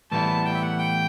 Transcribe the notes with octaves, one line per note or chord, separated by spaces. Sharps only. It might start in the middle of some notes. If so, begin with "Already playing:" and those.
A2 E3 G3 B3 E4 A5
G5
E5
F#5
G5